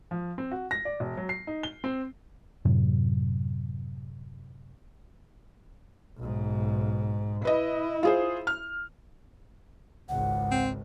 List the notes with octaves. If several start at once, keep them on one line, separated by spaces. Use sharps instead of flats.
F3
C4
F#4
A#6
D5
E1
F#3
C7
D#4
G7
C4
F#2 A2 C3 F#3
B1 G#2
E4 B4 D#5
F4 G#4 C5
F6
G#1 C#2 F#5
C4